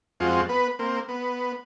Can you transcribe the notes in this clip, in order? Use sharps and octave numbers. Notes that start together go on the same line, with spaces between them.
F2 G#3 C4 F4 F#4
B3 B4
A#3 C4
B3